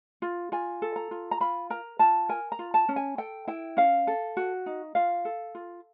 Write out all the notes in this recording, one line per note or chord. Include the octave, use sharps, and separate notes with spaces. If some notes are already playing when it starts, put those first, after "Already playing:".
F4
F4 G#5
A4
A#5
F4
A#5
F4 B5
A#4 A#5
F4 A5
A#4 G#5
A#5
F4
A5
C#4
G#5
A4 G5
E4 G5
C#4 F5
A4
F#4
D#4
F4 F5
A4
F4